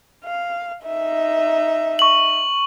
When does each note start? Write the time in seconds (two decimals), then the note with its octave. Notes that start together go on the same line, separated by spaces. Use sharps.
0.25 F5
0.84 D#4 E5
1.99 C#6 F#7